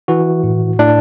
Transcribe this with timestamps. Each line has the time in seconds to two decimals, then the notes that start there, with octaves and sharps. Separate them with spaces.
0.08 E3 F#4
0.44 A2
0.79 A2 D4